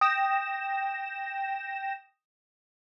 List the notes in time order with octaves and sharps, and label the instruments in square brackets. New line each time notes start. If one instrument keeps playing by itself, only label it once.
[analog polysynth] G5 A#6 E7 [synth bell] D#6